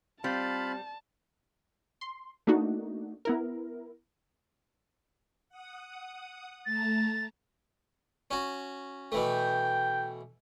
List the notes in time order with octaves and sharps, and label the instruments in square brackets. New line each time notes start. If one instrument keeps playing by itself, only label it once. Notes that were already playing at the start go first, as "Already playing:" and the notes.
[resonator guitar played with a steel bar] G3 [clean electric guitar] C4 [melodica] F4 F5 B5 [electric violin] A5
[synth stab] C6
A3 A#3 D4 D#4 F#4
B3 E4 A#4
[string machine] F#5 D#6
[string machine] A3 A5 A#5 [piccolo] A6
[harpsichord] C#4 F#4
[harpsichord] B2 E3 A3 [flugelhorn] G5